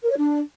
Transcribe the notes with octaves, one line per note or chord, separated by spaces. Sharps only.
A#4
C#5
D4